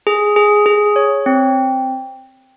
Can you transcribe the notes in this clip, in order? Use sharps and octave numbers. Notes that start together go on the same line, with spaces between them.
G#4
G#4
G#4
C#5
C4